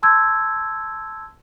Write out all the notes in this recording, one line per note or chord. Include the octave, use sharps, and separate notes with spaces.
A5 C6 E6 G6 G#6